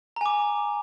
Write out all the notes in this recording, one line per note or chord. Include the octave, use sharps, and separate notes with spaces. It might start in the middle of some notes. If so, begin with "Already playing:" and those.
G#5 A#5 D6